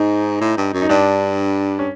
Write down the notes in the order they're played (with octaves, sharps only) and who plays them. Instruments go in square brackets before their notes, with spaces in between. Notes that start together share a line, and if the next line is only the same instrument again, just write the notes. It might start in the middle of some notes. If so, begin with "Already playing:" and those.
Already playing: [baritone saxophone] G#2 [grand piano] D#4
[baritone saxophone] A2
G2
F#2
[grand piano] D#4
[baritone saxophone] G2 [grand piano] D4
[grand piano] C#4